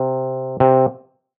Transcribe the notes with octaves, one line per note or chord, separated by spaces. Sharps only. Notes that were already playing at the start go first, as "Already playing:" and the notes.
Already playing: C3
C3